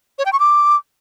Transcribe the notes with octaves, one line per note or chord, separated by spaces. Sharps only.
C#5
G5
C#6
D6